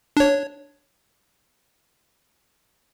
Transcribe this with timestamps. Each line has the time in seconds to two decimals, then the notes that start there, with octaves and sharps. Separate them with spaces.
0.17 D4 C#5